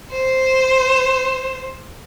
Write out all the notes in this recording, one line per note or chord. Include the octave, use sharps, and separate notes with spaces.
C5